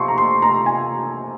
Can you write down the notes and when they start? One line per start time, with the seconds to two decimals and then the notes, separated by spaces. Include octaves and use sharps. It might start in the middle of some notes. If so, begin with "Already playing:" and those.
Already playing: C3 F3 C6 C#6
0.08 A#5
0.18 C6
0.42 A#5
0.66 G#5